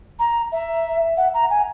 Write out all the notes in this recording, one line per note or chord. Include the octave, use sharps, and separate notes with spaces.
A#5
E5
F#5
A#5
G#5